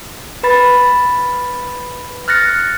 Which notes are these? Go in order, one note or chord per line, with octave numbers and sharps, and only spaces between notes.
B4 B5 A6
F6 F#6 A6 A#6 C#7